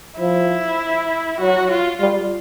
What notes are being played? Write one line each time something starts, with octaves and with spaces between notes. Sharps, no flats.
F3 E4
F#3 F#4
F4
G3